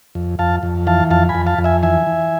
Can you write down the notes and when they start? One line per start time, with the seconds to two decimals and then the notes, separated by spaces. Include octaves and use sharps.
0.15 F2
0.39 F2 F5 A5
0.63 F2
0.87 E3 F5 A5
1.11 F2 F5 A5
1.29 G#5 B5
1.35 F2
1.46 F5 A5
1.58 F2
1.64 E5 G#5
1.83 E3 E5 G#5
2.07 E3